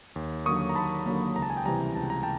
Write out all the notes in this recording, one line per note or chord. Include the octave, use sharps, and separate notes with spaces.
D#2
D3 F#3 A#3 C#6 D#6
A#5
D#2 A5 B5
D3 F#3 A#3
C#2 A#5
A5
G#5
G5 A5
C3 E3 G3 G#5 A#5
C#2 A5
A#5
G5 A5